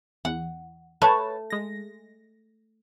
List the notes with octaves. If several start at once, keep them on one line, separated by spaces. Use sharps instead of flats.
E2 F#5
A3 B4 C#5 A5
G#3 A#6